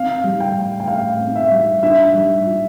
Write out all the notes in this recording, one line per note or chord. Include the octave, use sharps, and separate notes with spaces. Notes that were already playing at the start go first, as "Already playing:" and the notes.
Already playing: C4 F5
G3
G5
A2
G5
A2 F5
C4
E5
G3
D4 E5
G3
F4